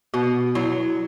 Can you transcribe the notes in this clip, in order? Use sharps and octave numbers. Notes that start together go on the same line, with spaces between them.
B2 F#4
F#3 E4